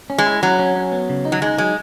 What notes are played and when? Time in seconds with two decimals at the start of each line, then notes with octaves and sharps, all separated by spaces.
0.10 C#4
0.18 G#3
0.26 E4
0.43 F#3 C#4
0.59 C#4
0.76 C#4
0.92 B3
1.09 C#3
1.25 D#4
1.32 F#3
1.42 G#3 D#4
1.58 F#3 G#3